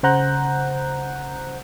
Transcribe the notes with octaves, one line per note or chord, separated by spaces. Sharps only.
C#3 C5 F#5 A#5 F#6 G6